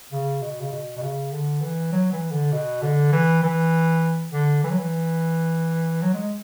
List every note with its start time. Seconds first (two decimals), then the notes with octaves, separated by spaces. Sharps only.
0.12 C#3
0.42 B2
0.61 C#3
0.72 B2
0.97 B2
1.02 C#3
1.32 D3
1.61 E3
1.92 F#3
2.13 E3
2.32 D3
2.53 B2
2.83 D3
3.12 E3
3.43 E3
4.33 D3
4.63 E3
4.70 F#3
4.78 E3
6.02 F#3
6.14 G#3